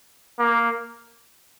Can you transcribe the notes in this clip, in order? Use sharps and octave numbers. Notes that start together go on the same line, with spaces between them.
A#3